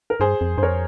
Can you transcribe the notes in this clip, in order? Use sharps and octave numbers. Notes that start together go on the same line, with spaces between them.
A#4
G2 G#4 C5
F2
G2 C5
F2 A#4 C#5